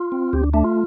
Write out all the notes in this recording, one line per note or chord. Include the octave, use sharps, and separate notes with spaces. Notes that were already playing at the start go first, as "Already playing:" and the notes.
Already playing: F4
C4
D2 G4
D4
A3 D4
F4